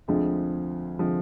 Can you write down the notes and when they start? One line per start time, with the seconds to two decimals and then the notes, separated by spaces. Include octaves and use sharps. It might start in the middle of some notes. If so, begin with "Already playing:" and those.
0.08 D2 D3 F3 G#3 C4
0.99 D3 F3 G#3 C4